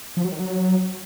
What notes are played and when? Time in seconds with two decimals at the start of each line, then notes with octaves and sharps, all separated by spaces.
0.17 F3
0.24 F#3
0.32 D#3
0.40 F#3